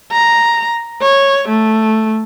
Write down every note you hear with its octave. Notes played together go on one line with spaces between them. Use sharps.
A#5
C#5
A3